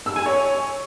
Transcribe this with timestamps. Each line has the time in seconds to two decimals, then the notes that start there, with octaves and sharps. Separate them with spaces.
0.06 E6
0.16 G#5
0.26 C#5